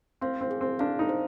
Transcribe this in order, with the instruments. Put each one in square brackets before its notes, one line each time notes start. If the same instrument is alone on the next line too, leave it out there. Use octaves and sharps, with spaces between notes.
[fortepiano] C4 [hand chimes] F5
[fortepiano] C4
[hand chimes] G#4
[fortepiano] C4
[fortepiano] D4 [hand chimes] F5
[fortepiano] D#4
[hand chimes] C5